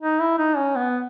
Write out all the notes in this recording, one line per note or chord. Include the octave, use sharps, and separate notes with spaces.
D#4
E4
D#4
C#4
B3